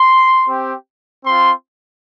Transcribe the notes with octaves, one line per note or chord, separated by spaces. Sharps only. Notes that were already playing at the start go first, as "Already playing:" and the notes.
Already playing: C6
C4 G4
C4 F4 C6